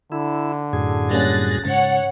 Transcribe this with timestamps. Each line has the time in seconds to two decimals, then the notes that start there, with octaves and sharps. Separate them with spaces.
0.12 D3 E4
0.73 F#2 A2 G#4
1.11 G3 A#3 C#4 F#6 A6 A#6
1.65 G#2 C#3 C#5 F#5 A6